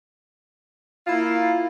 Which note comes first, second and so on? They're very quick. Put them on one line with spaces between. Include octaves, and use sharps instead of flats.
F4 E4 A#3